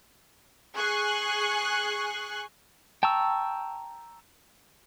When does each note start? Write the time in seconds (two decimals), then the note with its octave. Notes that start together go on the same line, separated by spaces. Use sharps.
0.75 G#4 C#6 F#6 C7
3.03 G5 A5 A#5 C#6 E6